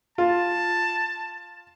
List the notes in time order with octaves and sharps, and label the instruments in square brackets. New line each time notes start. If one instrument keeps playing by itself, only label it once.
[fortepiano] F4 [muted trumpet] A5